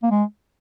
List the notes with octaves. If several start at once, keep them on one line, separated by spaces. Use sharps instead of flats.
A#3
G#3